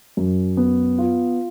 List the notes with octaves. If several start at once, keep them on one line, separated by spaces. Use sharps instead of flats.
F#2
B3
F4